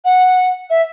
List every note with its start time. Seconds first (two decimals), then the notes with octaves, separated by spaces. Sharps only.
0.05 F#5
0.70 E5